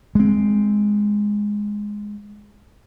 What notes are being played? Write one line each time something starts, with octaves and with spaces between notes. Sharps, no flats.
G#3 C4